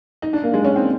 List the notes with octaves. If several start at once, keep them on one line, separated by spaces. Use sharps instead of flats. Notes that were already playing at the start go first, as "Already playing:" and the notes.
D#4
D4
A#3
G#3
C#4
C4